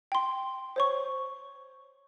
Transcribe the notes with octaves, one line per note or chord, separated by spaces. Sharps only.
G5 C6
C5 C#5 C#6